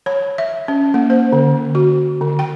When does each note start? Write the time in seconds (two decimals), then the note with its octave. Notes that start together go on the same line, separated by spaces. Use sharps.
0.06 C#5
0.38 E5
0.68 C#4
0.94 A#3
1.10 C5
1.32 D3
1.75 F#4
2.21 D3
2.39 G5